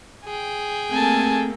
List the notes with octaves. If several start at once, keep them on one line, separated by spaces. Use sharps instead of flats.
G#4 G5
A3 A#3 C4 G#5 A5